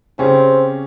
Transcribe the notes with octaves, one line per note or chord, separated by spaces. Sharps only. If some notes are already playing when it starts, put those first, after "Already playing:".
C#3 C4 C#4 G4